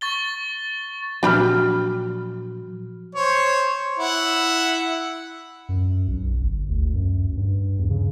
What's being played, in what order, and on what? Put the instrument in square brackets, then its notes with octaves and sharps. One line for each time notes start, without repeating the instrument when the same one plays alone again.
[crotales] C#6 A6 G7
[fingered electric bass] A#2 F3 F#3 [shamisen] D4 G4 B5 [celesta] F#4 F6
[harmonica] C5 C#5
E4 E5 F#5
[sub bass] F#2
B1
G1
D2
F#2
G2
E2
C#3